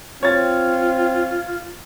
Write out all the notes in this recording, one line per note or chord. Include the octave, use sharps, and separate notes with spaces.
C4 F4 C#5 A6